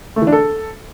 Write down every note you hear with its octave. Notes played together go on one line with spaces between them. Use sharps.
A3
E3
D4
A4